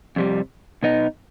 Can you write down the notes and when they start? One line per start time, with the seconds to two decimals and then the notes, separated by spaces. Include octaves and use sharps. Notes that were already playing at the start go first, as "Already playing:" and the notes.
0.16 F2 C3 G3
0.83 B2 B3 D#4